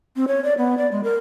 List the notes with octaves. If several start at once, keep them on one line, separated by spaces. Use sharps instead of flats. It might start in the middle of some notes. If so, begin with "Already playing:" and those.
C4
C#5
D5
B3
D5
G#3
A#4